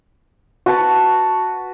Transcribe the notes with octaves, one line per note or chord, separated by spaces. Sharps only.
F#4 B4 A5